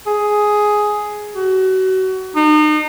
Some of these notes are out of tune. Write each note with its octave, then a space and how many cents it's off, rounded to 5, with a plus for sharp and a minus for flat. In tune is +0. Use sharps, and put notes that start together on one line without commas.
G#4 +5
F#4 +30
D#4 -35